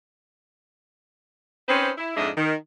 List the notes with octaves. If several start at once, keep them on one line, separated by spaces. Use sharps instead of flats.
C4 C#4 D#4 B4 C5
E4
F2 G#2 G#3 D4 D#5 E5
D#3